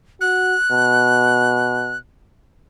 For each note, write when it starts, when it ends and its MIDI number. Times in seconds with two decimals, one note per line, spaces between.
0.21 0.55 66
0.21 1.97 90
0.72 1.98 47